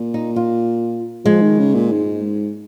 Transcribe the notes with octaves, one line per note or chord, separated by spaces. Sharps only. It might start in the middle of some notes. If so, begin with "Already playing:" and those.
Already playing: A#2
D#4
F4
F3 G#3
D#3
C#3
A#2
G#2